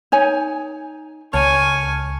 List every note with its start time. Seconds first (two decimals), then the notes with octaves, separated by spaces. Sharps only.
0.12 D#4 C#5 G#5
1.33 C#2 C#5 G#5 A5 C#6 F6